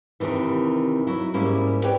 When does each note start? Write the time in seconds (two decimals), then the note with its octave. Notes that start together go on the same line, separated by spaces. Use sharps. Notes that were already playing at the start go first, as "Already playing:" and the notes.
0.20 D#2 G#2 C3 D#3 E3
1.07 F#3 E4
1.34 G#2 G3 A#3 C#4 E4
1.84 B4 C#5 D5 G5